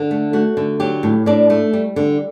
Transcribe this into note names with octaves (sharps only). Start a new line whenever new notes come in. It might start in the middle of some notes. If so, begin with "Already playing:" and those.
Already playing: D3 A4
A3
A3 F#4
D3
F#3 G4
A2
A2 D4 D5
A3
G3
D3